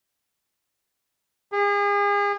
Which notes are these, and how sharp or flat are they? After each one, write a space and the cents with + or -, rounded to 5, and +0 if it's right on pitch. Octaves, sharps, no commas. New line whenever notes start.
G#4 -40